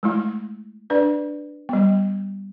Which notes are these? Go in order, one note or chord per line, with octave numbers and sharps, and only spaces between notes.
G#3 A3 E4
D4 B4 D5
G3 B3